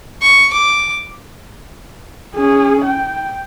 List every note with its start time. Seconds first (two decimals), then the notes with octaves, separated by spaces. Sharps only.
0.22 C#6
0.53 D6
2.36 C#4 G#4
2.85 G5